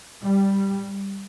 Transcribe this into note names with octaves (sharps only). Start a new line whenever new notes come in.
G3